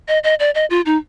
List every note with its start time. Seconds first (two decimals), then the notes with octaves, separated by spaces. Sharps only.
0.08 D#5
0.24 D#5
0.40 D5
0.55 D#5
0.70 F4
0.86 D#4